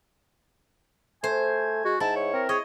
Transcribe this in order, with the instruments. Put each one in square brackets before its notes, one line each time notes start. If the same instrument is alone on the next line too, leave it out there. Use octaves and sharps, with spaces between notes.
[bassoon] A3 [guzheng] C5 [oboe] G#5
[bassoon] G#3 [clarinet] F#4
[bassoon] G#2 [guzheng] E4 [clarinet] A5
[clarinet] C#5
[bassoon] C4 [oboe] A#4
[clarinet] G#4 [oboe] C#5 [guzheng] D#5